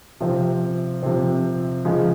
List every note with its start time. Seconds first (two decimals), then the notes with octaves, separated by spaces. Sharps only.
0.20 C3 F3 C4
1.03 C3 F3 C4
1.85 C#3 F3 G#3